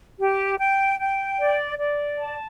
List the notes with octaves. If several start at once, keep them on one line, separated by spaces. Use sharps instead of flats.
G4
G5
G5
D5
D5
A5